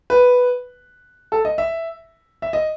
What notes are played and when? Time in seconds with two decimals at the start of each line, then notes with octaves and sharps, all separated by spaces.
0.10 B4
1.32 A4
1.45 D#5
1.58 E5
2.42 E5
2.53 D#5